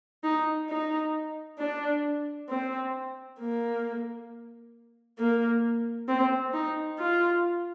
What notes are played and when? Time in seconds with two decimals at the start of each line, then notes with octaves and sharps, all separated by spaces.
0.24 D#4
0.69 D#4
1.59 D4
2.49 C4
3.39 A#3
5.19 A#3
6.08 C4
6.54 D#4
6.99 F4